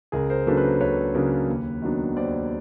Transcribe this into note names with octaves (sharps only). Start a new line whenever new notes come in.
C#2 G#4 A#4
A#4 C5
C#3 F#3 A#3 D4 A4 B4
B4
A#4 C5
C#2 B4 C#5
C#3 F#3 A#3 D4
D#2
D#3 F#3 B3 D4
D#2 C5 D5